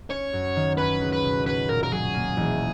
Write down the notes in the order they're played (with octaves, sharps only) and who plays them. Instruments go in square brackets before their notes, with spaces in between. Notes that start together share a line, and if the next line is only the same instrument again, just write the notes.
[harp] C#4 [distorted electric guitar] C#5
[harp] F#2
D#3
[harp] C#4 [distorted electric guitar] B4
[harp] C#2
[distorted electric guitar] B4
[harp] B2
[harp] C#4 [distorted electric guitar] B4
[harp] A#2 [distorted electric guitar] A#4
[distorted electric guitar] A#4
[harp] F#3 [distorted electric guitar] G#4
[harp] A#3
E1